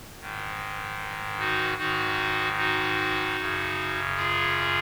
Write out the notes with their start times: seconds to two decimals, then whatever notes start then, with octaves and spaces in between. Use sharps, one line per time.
0.20 G#2 D#3
1.38 D#4 F#4
1.78 G#2 D#3 D#4 F#4
2.57 D#4 F#4
3.37 F#2 C#3
4.16 F4 G#4